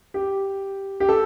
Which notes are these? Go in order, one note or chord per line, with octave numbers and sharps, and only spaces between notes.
G4
G4
A4